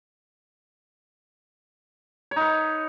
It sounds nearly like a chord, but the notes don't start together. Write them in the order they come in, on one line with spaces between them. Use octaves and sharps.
C#5 D#4 B4